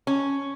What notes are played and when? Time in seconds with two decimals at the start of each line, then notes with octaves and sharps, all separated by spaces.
0.07 C#4